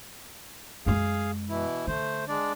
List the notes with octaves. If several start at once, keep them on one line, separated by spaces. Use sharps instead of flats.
F#2 G#3 G#4 F5
B2 E3 E4
D3 A3 C5
G#3 D4 D5